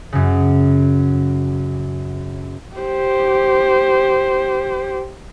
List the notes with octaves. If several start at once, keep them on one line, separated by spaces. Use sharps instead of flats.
F#2 C#3
G4 C5